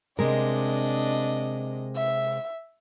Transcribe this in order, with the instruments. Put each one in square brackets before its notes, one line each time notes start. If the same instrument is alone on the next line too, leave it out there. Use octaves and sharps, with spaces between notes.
[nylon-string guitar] C3 G#3 A#4 [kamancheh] D4 D#5
[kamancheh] E5